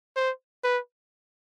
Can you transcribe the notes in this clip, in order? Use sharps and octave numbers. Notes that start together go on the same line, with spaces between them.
C5
B4